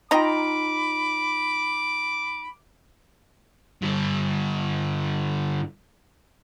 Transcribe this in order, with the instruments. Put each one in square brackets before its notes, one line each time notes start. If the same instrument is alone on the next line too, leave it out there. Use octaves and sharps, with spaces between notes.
[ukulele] D#4 F4 G5 [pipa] D#5 A#5 [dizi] B5 [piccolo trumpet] D6
[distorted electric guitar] G2 D3